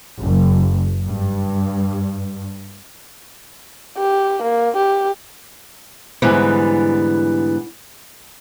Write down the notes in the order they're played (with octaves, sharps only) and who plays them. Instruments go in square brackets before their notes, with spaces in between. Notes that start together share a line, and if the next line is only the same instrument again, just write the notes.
[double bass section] F#1
G2
[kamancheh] G4
A#3
G4
[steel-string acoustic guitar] G#2 D3 E3 G3 B3